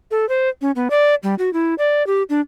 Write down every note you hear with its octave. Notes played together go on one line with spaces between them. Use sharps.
A4
C5
C#4
B3
D5
G3
F#4
E4
D5
G4
D4